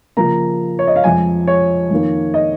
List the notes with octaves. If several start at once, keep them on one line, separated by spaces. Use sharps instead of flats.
C#3 F3 A#3 A#5
C#5
D#5
F5
F2 F3 G#3 G#5
C#5
F2 D#3 A#3
D#5